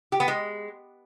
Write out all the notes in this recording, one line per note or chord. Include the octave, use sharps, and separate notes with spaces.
G4
B3
G#3